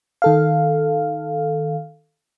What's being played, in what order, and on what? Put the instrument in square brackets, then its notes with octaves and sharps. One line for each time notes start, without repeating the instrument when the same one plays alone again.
[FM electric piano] D#3 A4 F5